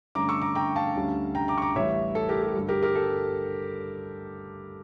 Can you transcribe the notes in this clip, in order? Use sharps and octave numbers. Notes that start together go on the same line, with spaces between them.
G2 D3 A3 C#4 A#5 D6
C#6 E6
A#5 D6
G5 A#5
F5 A5
D2 D3 G3 C#4
G5 A#5
A#5 D6
C#6
A#5 D6
A1 A2 E3 G3 C#5 E5
A4
G4 A#4
G4
G2 D3 G3
G4 A#4
G4 A#4
A4